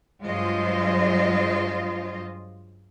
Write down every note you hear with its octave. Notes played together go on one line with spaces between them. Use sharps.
G2 F#3 G#3 F4 C5 D#5